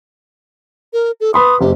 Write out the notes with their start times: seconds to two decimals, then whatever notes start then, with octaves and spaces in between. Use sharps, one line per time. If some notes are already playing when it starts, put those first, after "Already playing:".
0.93 A#4
1.21 A4
1.34 B4 B5 C6 D#6
1.61 F#1 G4